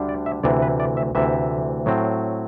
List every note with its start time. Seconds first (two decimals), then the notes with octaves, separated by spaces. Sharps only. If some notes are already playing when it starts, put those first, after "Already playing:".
Already playing: D2 D3 G3 D4
0.09 D5
0.26 E5
0.43 D2 C3 E3 D5
0.62 B4
0.80 D5
0.97 E5
1.15 D2 C3 E3 E5
1.86 A2 F#3 C4